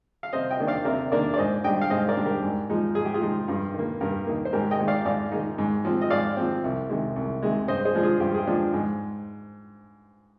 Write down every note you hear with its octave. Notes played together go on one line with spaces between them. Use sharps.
F5
C3 C5 D#5
D#5 G5
D#3 A#3 D4
D5 F5
C3 A#4 D5
D#3 A#3 D4 A#4 D5
D5
G#2 C5 D#5
G3 D4 D#5 G5
F5
G#2 C5 D#5
A#4 D5
G3 D4
G4 A#4
G#2
F3 G#3 D#4
G#2 G#4
G4
F4 G#4
F3 G#3 D#4
G2
D#3 A#3
G2 G4 A#4
D#3 A#3
C5
G#2 G4 A#4
D#5 G5
D#3 G#3 D#4
D5 F5
G#2 D5 F5
D#3 G#3 D#4
G#2
F3 C4
D#5
G#2 D5 F5
F3 C4
C2
C3 D#3 G#3
C2
C3 D#3 G#3
G2 C5 D#5
G#4 C5
F3 G#3 D4
F4 G#4
G2 G4
G#4
G4
F3 G#3 D4
G#2